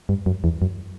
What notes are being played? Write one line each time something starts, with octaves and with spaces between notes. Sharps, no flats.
G2
F#2
E2
F#2